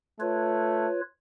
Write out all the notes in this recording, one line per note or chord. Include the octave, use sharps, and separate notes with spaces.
A3 F4 B4 C#5